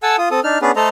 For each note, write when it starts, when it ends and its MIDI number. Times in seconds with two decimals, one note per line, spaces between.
0.03 0.16 69
0.03 0.16 78
0.03 0.16 80
0.03 0.16 81
0.03 0.16 88
0.18 0.29 65
0.18 0.29 87
0.31 0.40 60
0.31 0.40 69
0.31 0.40 87
0.44 0.58 62
0.44 0.58 63
0.44 0.58 89
0.62 0.71 59
0.62 0.71 61
0.62 0.71 62
0.62 0.71 68
0.62 0.71 71
0.76 0.89 57
0.76 0.89 69
0.76 0.89 72
0.76 0.89 75
0.76 0.89 82